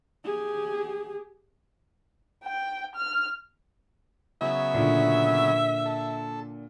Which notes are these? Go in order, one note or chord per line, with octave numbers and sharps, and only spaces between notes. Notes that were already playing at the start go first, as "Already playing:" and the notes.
G4 G#4
G5
F6
C#3 F#3 B3 E5
A#2 D3
A4